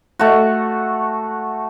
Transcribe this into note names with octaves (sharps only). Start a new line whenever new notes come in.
A3 F#4